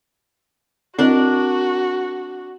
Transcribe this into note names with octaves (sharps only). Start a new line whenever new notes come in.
C4 D4 E4 F#4 A#4 D#5